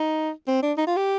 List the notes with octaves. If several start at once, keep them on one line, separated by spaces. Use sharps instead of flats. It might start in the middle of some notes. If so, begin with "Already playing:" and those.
Already playing: D#4
C4
D4
D#4
F4
G4